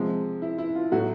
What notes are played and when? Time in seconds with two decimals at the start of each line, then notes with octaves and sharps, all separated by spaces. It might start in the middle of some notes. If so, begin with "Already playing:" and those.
Already playing: C3 F3 G#3
0.42 E4
0.58 E4
0.75 F4
0.91 A2 F#3 A3 F#4